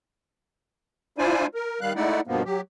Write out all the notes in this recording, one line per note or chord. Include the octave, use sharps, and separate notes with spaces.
D4 E4 F4 C5 D5 G#5
A#4
D#3 G3 F5 F#6
G#3 A3 D#4 E4 D5 F#5
G2 B2 F3 A#3 B3
F#3 G4